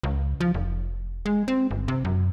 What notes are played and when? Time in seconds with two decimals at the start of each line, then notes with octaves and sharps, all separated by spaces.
0.03 C#2
0.40 F3
0.55 F1
1.26 G#3
1.48 C4
1.71 G1
1.88 C3
2.05 F#2